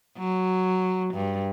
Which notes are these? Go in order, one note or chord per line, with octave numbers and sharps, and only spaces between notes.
F#3
G2